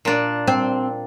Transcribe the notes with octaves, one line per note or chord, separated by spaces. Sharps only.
A#2 D4
C4